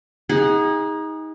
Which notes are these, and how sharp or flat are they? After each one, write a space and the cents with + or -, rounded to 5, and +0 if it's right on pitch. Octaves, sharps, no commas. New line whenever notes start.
D#4 +25 G#4 -25 F#5 +0